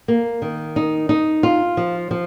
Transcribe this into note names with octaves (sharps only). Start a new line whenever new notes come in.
A#3
D#3
D#4
D#4
F4
F3
F3